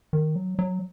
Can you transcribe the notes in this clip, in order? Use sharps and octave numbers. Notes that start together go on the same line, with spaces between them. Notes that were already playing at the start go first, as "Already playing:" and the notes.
D#3
F#3
F#3